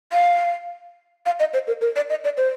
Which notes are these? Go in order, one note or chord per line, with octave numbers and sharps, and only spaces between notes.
F5
F5
D#5
C5
A#4
A#4
D5
D#5
D5
C5